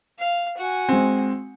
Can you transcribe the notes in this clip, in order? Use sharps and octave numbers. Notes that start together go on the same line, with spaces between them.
F5
F#4 G#5
G#3 C4